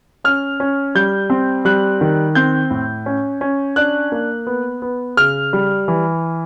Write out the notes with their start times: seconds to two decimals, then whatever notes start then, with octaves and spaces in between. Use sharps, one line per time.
0.24 C#4 F6
0.60 C#4
0.95 G3 G6
1.30 C4
1.65 G3 F#6
2.01 D#3
2.35 C4 G6
2.71 A2
3.06 C#4
3.41 C#4
3.76 D4 F#6
4.12 A#3
4.47 B3
4.82 B3
5.17 C#3 F6
5.53 G3
5.88 E3